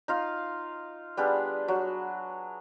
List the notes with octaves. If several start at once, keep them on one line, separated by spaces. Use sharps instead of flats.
D#4 F4 F5
G3 B3 D4 G#4
F#3